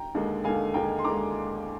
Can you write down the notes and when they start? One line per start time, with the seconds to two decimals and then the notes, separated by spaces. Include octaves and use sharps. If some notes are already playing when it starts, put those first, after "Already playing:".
Already playing: G5 A#5
0.15 D#2 D3 G#3
0.44 D#2 D3 G#3 F5 G#5
0.74 D#2 D3 G#3 G5 A#5
0.99 C6
1.04 D#2 D3 G#3 A#5 D6